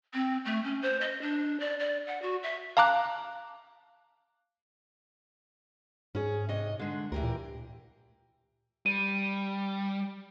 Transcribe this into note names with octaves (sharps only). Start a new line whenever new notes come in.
C4
A3
C#4
C5
D#5
D4
D5
D5
F#5
F#4
E5
F5 A5 A#5 D6 F#6
G#2 C#4 G#4
C3 C#5 D#5
D3 G#3
D2 E3 G4 A#4
A#2
G3 D#7